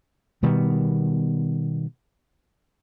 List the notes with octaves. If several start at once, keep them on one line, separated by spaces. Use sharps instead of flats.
B2 D#3 G3 B3